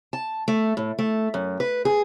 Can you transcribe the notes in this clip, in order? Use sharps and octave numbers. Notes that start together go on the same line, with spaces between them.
A5
A3
A2
A3
F#2
B4
G#4